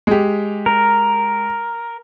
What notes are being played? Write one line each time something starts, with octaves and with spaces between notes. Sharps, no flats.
G#3 G4
A#4